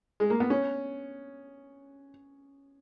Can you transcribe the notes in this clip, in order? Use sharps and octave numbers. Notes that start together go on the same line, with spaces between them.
G#3
A#3
B3
C#4